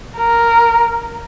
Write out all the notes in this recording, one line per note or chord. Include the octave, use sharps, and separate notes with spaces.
A#4